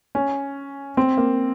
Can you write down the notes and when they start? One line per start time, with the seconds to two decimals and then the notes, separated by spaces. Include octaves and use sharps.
0.15 C#4
0.97 C4
1.17 A#3